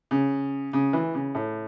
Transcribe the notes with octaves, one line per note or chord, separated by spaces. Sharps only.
C#3
C#3
E3
C#3
A2